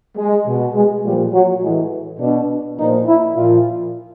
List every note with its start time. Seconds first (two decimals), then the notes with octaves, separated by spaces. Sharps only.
0.18 G#3
0.47 B2
0.75 G#3
1.04 A#2 F3 G3
1.34 F#3
1.63 A2 E3 G#3
2.20 B2 D4
2.78 A#2 F3 D#4
3.07 E4
3.37 A#2 F3 F4